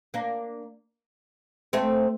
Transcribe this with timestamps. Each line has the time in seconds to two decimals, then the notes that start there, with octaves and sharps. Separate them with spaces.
0.14 A#3 D4
1.73 A3 C4